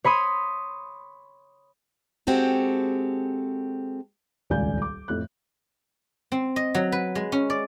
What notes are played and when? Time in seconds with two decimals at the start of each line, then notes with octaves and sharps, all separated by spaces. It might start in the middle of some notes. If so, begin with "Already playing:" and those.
0.04 C#5 B5 C6 D#6
2.27 G#3 C4 F#4 G4 A4
4.50 D#1 G#1 C#2 D5 G#5 G6
4.82 D6
5.08 F2 A2 F#6
6.32 C4
6.56 D#5
6.75 F#3
6.92 B4
7.15 G#3
7.32 C#4
7.50 D5